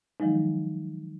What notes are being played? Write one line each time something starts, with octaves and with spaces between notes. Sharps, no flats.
D#3 F3 F#3 G#3 D#4